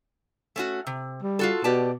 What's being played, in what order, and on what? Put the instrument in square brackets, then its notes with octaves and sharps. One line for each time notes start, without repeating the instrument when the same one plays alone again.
[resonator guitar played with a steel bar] A3 C#4 F#4
C3
[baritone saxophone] G3
[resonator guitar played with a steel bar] F4 F#4 A4
[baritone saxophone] B2 [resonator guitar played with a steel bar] G4 D5 A5